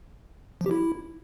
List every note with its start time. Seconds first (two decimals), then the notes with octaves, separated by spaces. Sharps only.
0.61 F3
0.66 G4
0.71 E4